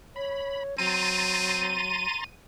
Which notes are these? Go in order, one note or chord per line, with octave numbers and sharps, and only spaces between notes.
C#5 B5
F#3 C4 A#5 C6 A6 D#7